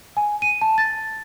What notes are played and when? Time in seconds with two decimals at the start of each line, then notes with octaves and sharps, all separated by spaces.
0.17 G#5
0.42 D#7
0.61 A5
0.78 A6